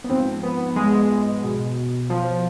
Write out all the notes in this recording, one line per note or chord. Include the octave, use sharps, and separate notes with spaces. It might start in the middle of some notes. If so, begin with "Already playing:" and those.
B3
G#2 F3 C4
B3
G#3
B2
F3